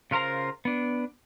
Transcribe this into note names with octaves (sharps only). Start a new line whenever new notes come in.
C#3 F4 A#4 C5 A#5
B3 D4